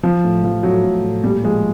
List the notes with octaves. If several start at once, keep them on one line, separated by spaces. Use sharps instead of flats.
F3
A2
F3
A2 F#3
A2
A2
A#2 G3
F3 G#3